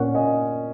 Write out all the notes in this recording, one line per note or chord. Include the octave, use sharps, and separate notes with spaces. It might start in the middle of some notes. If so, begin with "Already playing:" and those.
Already playing: A#2 A#3 C#4 C#5 F#5
D#5 G#5